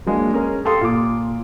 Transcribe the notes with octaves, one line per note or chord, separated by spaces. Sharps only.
F#3 G#3 A#3 D4
C#4 G#4 A#4
G4 A4 F5 C6 D#6
A#2 D6